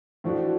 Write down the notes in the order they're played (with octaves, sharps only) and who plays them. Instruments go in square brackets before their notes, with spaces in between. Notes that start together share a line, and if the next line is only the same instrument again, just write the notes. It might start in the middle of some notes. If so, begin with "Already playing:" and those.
[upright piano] A2 F3 A3 D4 F#4